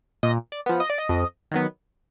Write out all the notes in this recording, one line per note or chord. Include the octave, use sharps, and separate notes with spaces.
A#2 D#5
D5
F3 B3
D#5
D5
D#5
F2
D#3 F#3 B3